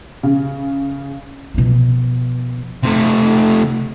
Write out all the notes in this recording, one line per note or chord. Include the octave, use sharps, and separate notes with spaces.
C#3
B2 F3
C3 A3